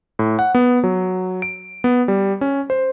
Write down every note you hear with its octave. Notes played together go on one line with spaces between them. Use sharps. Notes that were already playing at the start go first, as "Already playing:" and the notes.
A2
F#5
B3
F#3
D7
B3
G3
C#4
C5